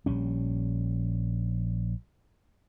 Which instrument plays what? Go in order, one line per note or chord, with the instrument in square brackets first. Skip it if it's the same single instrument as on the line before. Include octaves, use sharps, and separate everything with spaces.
[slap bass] A#1 G3 C#4